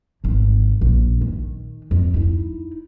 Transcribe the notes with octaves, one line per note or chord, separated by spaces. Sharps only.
G#1 G2
A#1
D#3
F2
D#4 E4